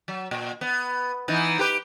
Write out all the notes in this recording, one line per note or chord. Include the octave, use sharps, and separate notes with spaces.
F#3
A#2
B3
E3 B3 D#4
G4 B4